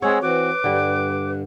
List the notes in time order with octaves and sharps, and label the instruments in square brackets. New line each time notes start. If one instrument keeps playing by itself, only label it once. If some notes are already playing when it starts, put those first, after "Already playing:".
[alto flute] G#3 [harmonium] C4 G#4 F#5 [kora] C#5 [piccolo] E6
[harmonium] E3 C4 F#4 [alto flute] B4 [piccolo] D6
[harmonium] G2 [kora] D3 G3